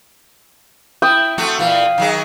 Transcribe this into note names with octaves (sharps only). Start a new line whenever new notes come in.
E4 G5 D#6
A3 C4 F#4
A#2 E3 F5
D#3 F#3 G#4